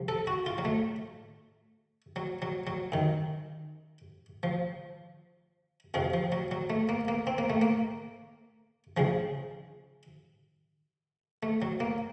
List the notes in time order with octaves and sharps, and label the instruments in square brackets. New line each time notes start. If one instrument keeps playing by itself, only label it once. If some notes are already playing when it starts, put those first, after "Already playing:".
Already playing: [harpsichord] C2 F3
A4
F#4
F4
F#3
A3
F#3
F#3
F#3
F#2 D#3
F3
F2 C3 F3
F3
F#3
F#3
A3
A#3
A#3
C4
A#3
A3
A#3
C#2 C#3 F3
A3
F#3
A#3